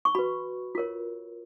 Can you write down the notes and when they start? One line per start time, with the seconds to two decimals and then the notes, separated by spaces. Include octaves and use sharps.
0.05 C#6
0.15 F#4 B4 B5
0.75 F4 A#4 C#5